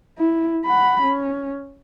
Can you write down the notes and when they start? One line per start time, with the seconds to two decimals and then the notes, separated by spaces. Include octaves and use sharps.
0.18 E4
0.66 F#5 B5
1.03 C#4